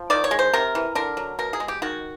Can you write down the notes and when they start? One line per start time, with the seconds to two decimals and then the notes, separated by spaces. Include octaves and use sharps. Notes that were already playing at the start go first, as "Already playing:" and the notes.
Already playing: F3
0.10 D#3 D5
0.24 C#5
0.31 G#3
0.39 C5
0.53 C3 A#4
0.75 E3
0.95 D3 A#4
1.17 F#3
1.39 B2 A#4
1.53 G#4
1.60 G#3
1.68 G4
1.82 D#3 F#4